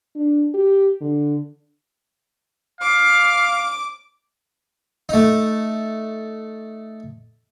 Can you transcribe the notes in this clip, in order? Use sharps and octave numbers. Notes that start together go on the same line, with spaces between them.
D4
G4
D3
F5 D6
A3 D#4